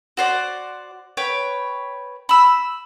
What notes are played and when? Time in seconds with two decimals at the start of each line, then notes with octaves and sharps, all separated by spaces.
0.17 F#4 C5 D5
1.17 B4 C#5 G5
2.29 B5 E6